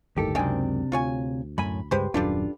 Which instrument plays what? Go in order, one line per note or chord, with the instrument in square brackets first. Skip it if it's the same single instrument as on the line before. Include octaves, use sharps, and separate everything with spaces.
[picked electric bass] G1 A2 D#3 [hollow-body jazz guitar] D#2 G4 A4
[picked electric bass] C#2 F#2 [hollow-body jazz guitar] C3 C4 D4 [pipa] D#3 G5 G#5
[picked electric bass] D2 [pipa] F4 C#5 G#5
[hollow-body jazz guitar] F#2 A2 G#5 [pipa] B5
[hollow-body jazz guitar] C#2 G2 G#3 [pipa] G4 B4 C5
[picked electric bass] D#1 F#2 [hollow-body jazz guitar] D4 F4 [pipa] G4 A4 B4